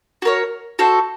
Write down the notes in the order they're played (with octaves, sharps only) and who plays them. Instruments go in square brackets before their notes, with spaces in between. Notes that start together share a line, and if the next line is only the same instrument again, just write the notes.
[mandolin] F#4 A#4 C#5
F#4 A4 C5